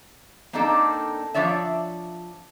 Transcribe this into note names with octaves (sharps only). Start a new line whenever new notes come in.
A#3 C4 D4 D#4 A4
F3 D4 C#5 D5 E5